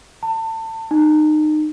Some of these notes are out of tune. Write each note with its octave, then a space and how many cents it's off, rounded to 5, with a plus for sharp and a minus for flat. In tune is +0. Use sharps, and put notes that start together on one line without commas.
A5 +30
D#4 -25